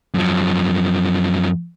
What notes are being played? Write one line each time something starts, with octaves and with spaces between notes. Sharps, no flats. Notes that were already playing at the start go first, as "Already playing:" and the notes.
F#2 F3